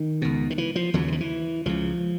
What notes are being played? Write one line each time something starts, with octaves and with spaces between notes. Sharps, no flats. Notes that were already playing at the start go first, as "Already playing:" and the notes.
Already playing: D#3
C#2 B2
D#3
E3
F3
D#2 C#3 F#3
D3
D#3
E3
C#2 C#3 F3